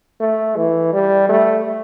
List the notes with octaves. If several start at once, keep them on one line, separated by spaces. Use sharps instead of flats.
A3
E3
G3
A3